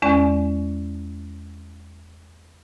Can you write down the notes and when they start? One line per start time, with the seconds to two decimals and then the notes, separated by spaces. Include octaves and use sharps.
0.02 E2 G#3 C#4 D5 G#5